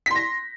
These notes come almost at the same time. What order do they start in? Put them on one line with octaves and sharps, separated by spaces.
B6 C6 A#6